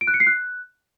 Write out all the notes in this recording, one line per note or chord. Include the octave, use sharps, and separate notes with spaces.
D7
F#6
C#7
C7
F#6